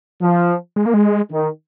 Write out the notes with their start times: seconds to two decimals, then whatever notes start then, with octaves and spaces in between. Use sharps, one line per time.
0.21 F3
0.76 G#3
0.86 A#3
0.94 G#3
1.31 D#3